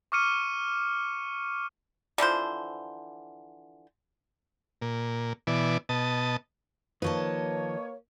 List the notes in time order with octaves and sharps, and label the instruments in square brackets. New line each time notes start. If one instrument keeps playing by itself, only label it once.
[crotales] C#6 D6 F6 C#7 D#7
[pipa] D3 E3 F3 C5
[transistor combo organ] A#2
B2 E3 D5
B2 D#5 A5
[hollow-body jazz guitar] D#3 F3 [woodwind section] A#3 C#5 [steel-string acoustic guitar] B4 D#5 A5